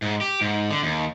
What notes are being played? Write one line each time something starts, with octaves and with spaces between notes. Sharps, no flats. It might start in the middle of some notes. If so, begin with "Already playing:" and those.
G#2
G4
G#2
D3
D#2